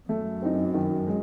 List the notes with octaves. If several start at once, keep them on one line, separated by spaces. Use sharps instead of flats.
F#2 A3
C4 D#4
D#3
G#3